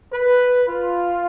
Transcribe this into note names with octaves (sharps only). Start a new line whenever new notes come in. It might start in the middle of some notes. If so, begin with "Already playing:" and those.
B4
F4